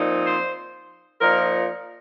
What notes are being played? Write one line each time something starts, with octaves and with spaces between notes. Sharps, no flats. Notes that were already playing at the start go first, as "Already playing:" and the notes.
Already playing: A#2 F3 C4 D#4
C5
A#2 F3 D#4 A#4